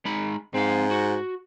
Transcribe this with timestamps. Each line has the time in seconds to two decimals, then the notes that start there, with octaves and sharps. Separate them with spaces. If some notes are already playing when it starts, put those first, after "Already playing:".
0.05 G#3 D#4 B5
0.54 G#2 C4 F5
0.91 F#4